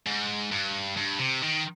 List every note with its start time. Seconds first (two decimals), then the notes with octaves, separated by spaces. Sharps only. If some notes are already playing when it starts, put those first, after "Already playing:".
0.07 G#2
0.51 G2
0.97 G2
1.20 C3
1.43 D#3